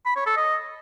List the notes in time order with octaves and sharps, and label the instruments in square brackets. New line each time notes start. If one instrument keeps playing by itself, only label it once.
[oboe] B5
C#5
A4
D#5